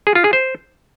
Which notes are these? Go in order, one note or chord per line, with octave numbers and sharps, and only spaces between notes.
G#4
F4
G#4
C5